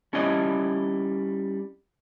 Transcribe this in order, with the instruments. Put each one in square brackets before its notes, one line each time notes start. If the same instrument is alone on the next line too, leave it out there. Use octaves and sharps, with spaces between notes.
[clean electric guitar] G3 C#4 E4 D5 D#5